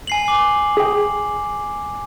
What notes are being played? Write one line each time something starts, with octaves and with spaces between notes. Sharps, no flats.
G#5 C7 F#7
D6 F#7
G#4 G5